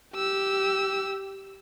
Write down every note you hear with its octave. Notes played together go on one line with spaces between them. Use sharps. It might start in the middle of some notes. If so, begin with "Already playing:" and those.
G4 E6